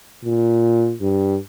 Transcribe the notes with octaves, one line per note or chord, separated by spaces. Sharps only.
A#2
G2